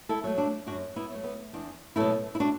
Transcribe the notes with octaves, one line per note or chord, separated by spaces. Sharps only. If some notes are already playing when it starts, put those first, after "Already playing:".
E4 A4
F#3 A3
D4 F#4
F#2 D4 F#4
B3 E4
F#3 A3
B3
E2 D4
B2 F#3 A3 E4 A4
E4
D4 F#4